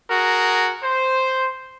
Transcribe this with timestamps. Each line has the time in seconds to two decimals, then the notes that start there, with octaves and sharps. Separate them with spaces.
0.10 F#4 G#4 A#4
0.83 C5